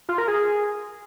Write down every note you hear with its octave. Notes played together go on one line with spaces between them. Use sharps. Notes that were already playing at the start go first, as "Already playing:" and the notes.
F4
A#4
G#4